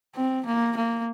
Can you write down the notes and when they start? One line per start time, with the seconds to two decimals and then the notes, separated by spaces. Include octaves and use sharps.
0.16 C4
0.46 A#3
0.77 A#3